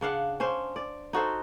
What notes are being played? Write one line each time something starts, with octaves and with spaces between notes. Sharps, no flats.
C#3 D4 F5 F#5
C#4 D4 C5
D5
D#4 F#4 A4 C5